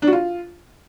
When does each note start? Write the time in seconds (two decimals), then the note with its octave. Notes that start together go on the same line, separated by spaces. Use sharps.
0.02 D4
0.07 F#4
0.13 F4